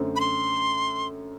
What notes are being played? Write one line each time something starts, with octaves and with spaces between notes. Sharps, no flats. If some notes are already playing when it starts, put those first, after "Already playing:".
Already playing: F#2 D3 A3 C4
B5
C6